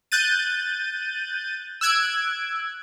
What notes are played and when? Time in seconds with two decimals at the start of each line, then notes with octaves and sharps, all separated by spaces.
0.12 F#6 G6 A6 D#7
1.81 E6 F#6 G#6 D7